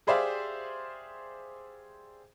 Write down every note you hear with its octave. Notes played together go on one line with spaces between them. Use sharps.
G4 G#4 C5 D5 E5 F5